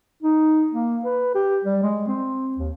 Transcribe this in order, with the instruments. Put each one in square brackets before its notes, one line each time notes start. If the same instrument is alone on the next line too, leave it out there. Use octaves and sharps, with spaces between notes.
[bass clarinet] D#4
A#3
B4
G4
G3
G#3
C4
D#2